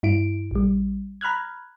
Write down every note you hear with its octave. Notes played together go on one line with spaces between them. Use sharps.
G2 E4 D7
A#1 G3
A#5 B5 F6 F#6 G#6